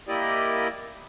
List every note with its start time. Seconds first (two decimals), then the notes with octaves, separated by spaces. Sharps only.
0.08 A#3 E4 G4 D5 D#5